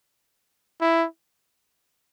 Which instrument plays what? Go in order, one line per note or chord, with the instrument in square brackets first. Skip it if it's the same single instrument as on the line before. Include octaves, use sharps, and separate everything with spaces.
[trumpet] E4